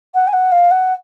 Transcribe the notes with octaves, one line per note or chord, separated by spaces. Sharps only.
F#5
G#5
F#5
F5
F#5